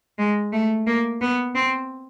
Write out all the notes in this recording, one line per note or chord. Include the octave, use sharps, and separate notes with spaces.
G#3
A3
A#3
B3
C4